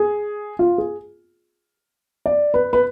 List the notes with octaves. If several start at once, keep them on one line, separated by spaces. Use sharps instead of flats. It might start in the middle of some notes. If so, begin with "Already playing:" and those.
Already playing: G#4
F4
G#4
D5
B4
B4